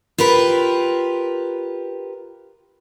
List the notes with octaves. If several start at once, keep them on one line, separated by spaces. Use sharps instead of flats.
F4 G4 A#4 B4